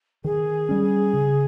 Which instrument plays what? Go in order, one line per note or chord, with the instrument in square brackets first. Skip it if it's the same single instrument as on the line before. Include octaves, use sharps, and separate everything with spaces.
[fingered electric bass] D#3 [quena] G#4
[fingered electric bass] G3 C#4
C#3